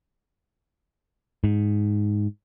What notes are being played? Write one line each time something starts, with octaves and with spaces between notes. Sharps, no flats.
G#2